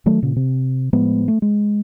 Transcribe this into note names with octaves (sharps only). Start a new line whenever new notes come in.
D#3 F#3 A3
A#2 C#3
C3
A2 F3 G#3 B3
A3
G#3